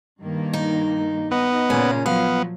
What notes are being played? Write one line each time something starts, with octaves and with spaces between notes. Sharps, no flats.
G2 D#3 A#3
D#4
B3 D#4 D#5
A#2 C#3 C#4
F3 F#3 B3 F5